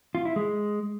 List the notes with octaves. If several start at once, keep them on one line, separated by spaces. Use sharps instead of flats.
F4
E4
G#3